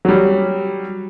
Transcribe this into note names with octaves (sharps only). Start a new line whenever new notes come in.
F#3 G3